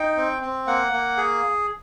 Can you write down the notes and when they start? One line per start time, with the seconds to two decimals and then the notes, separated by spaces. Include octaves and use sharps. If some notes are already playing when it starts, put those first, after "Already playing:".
Already playing: D#4 G5
0.17 C4
0.42 C4
0.67 A#3 F#5
0.92 A#3
1.17 G#4